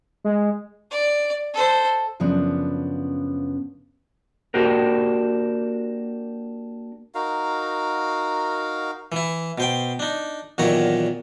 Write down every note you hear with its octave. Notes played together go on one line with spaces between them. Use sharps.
G#3
D5
A4 C5
F#2 C#3 F3 B3 D4
A#3 D4 F#4 G4 A#4
D#4 F#4 A#4 F5
E3 E4
B2 C5 G5
D4 D#4
E2 A#2 D#3 F#3 C#5 A#5